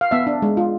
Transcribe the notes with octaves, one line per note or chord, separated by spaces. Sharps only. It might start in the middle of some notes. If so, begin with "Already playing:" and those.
F5
B3 E5
D4
G#3
F4